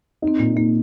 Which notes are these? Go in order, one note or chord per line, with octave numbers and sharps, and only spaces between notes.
D#4
C4
A#2 A#3
A#3 D#4